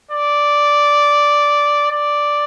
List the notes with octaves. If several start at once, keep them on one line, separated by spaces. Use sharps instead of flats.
D5
D5